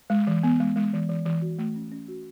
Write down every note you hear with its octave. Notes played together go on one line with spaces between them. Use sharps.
G#3
E3
B3
G#3
G#3
E3
E3
E3
F#4
A3
C#4
C#4
F#4